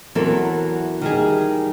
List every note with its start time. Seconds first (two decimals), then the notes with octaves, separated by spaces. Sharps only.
0.15 E2 E3 F#3 C4 A4 A#4
1.01 D#3 G3 G#4